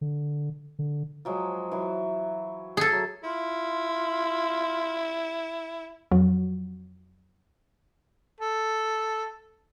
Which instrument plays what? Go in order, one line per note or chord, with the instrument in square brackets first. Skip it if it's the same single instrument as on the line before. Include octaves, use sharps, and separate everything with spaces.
[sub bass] D3
D3
[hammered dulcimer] F3 F#3 G#3
E3 F#3
[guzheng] G#4 A4
[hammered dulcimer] F#3
[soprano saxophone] E4 [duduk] F4
[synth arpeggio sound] F2 F#3
[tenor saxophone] A4